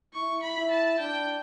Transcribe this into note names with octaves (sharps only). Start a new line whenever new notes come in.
E4 C#6
B5
E4
A5
D4 G5